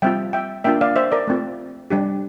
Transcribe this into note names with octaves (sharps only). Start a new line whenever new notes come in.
G3 C4 F4 E5 G5
E5 G5
A#3 D4 F4 E5 G5
D5 F5
C5 E5
A#4 D5
A3 C4 F4
G3 D4 G4